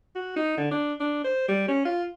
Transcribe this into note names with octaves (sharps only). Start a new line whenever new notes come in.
F#4
D#4
D3
D4
D4
C5
G3
C#4
F4